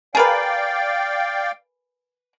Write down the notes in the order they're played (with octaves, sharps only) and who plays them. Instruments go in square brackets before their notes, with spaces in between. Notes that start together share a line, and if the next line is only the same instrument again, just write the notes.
[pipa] G#4 A#4 B4 [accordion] D5 F5 G5